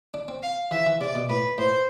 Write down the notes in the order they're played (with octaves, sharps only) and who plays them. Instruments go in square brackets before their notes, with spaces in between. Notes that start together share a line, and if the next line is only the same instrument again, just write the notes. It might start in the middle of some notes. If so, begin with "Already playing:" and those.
[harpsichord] D4
C4
[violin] F5
[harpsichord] E3 [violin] E5
[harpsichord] E3
[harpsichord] C3 [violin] D5
[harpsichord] B2
[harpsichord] A2 [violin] B4
[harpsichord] A2 [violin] C5